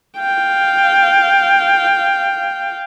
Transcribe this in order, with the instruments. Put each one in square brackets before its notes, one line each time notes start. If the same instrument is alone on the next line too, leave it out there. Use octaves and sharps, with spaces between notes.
[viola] F5 G5